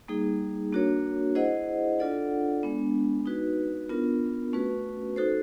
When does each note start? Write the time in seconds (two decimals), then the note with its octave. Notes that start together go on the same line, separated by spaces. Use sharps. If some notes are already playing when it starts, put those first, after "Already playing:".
0.08 G3 A#3 D#4 G#4
0.73 A#3 D4 F#4 A#4 C#5
1.35 E4 G#4 C5 D#5 F#5
1.99 D4 F4 A4 D5 F#5
2.63 G#3 B3 D4
3.26 D#4 F#4 B4
3.89 B3 D4 F4 A#4
4.53 A3 C#4 F#4 B4
5.16 D#4 F#4 A4 C5